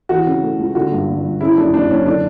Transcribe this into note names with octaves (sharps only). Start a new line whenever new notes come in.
E3 F#4
C#3
A3
C#2
D3 F#4
G2
G1
G1
C#3 E4
F#2 D4
F#1 D4
F#1 C#4
D3 D4